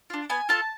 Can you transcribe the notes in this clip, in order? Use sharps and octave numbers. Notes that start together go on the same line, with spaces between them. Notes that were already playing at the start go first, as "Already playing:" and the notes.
D4 F4
B3 G#5
F4 A4 A5